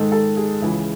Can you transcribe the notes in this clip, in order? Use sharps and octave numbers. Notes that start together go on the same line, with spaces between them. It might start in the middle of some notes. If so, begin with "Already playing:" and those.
Already playing: G#2 D#3 A4
A4
G#4
C#2 C#3 E3